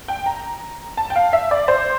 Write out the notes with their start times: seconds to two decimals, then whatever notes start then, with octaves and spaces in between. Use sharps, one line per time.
0.08 G5
0.26 A#5
0.97 A5
1.10 G5
1.16 F5
1.33 E5
1.51 D5
1.68 C5